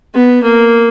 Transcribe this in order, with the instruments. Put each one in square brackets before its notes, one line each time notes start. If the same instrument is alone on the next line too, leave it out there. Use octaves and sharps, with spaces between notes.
[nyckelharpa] B3
A#3